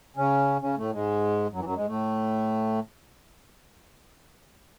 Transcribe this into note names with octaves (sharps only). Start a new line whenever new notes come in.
C#3 C#4
C#3 C#4
A2 A3
G#2 G#3
F#2 F#3
E3
F#2 F#3
G#2 G#3
A2 A3